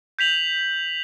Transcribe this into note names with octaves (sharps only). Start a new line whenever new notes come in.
G6 B6 F7 F#7